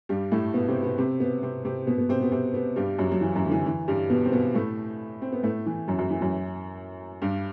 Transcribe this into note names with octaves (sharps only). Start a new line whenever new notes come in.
G2 G3
A2 A3
B2 B3
C3 C4
B2 B3
C3 C4
B2 B3
C3 C4
C3 C4
B2 B3
B2 B3
C3 C4
B2 B3
C3 C4
B2 B3
G2 G3
F#2 F#3
F#3
E3
F#2 F#3
D3
E3
E3
G2 G3
B2 B3
C4
B2 B3
A2 A3
C4
B3
A2 A3
E3
F#2 F#3
F#2 F#3
E3
F#2 F#3
G2 G3